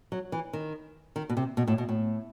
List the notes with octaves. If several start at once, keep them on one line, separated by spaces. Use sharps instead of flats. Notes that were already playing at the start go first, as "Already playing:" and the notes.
F#3
E3
D#3
D#3
B2
C3
B2
A2
B2
A2